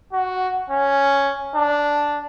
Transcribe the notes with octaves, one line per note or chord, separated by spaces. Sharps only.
F#4
C#4
D4